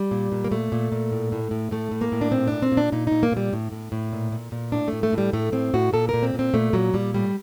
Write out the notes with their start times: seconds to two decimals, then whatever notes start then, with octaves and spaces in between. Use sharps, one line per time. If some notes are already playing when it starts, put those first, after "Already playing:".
Already playing: G3
0.11 A#2
0.32 A#2
0.44 A#3
0.51 A#2 A3
0.72 A#2
0.92 A#2
1.11 A2
1.32 A2
1.51 A2
1.71 A2 A3
1.91 A2
2.01 A#3
2.12 A2
2.21 D4
2.31 A#2 C4
2.48 A#2 D4
2.62 C4
2.72 A#2
2.77 D4
2.92 A#2 D#4
3.07 A#2 D#4
3.23 A#3
3.32 A#2 G3
3.53 A2
3.72 A2
3.92 A2
4.13 A#2
4.32 A#2
4.52 A#2
4.72 A2 D4
4.88 A2 A3
5.03 A3
5.13 A2
5.18 G3
5.33 A2 A3
5.52 A2 C4
5.74 A2 F#4
5.93 A#2 A4
6.09 A#2 A#4
6.23 C4
6.34 A#2
6.39 C4
6.54 A#2 A3
6.73 A#2 F#3
6.94 A#2 G3
7.14 A2 G3